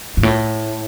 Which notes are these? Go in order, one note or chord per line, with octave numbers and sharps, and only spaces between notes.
G2
A2